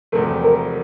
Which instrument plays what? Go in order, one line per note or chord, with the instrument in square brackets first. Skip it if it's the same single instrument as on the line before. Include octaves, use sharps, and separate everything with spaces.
[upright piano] E1 E2 C3 F3 A3 [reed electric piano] A#4
[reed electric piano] A#4